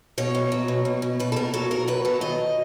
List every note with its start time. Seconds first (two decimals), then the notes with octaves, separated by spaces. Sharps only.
0.18 B2 C#5
0.35 B2
0.52 F#3
0.68 B2
0.85 B2
1.02 B2
1.20 B2 B4
1.32 A4
1.36 B2 A#4
1.54 F#3 A4
1.71 F#3 A#4
1.88 B2 B4
2.05 F#3 A4
2.21 D#3 D#5